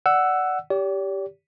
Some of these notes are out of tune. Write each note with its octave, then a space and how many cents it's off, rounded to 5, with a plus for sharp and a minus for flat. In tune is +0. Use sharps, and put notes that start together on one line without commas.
D5 +0 F#5 +5 E6 +5
G4 +0 D5 -45